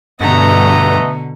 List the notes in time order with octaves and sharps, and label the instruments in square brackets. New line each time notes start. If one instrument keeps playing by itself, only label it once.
[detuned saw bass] G2 [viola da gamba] B2 D3 [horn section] A3 B3 D#5 [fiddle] A#5